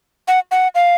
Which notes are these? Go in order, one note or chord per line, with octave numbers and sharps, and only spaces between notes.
F#5
F#5
F5